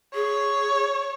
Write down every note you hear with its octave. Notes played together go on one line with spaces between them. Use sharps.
G#4 C#5